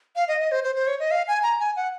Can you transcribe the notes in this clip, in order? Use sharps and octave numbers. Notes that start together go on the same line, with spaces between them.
F5
D#5
D#5
C5
C5
C5
C#5
D#5
F5
G#5
A#5
G#5
F#5